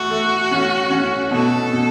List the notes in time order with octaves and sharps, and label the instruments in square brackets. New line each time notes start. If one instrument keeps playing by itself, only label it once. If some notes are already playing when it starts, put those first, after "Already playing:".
Already playing: [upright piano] A3 [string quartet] F#4
[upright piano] A3
C#4
C#4
[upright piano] B2 [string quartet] A4
[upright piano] B2